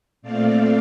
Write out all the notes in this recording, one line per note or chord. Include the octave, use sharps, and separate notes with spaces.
A#2 A3 C4 D5 F5